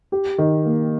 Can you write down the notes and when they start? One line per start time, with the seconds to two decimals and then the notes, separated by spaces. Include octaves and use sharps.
0.12 G4
0.38 D#3
0.65 A#3